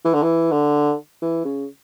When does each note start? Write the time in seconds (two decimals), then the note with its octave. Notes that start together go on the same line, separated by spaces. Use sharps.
0.05 E3
0.14 D3
0.22 E3
0.51 D3
1.22 E3
1.45 C#3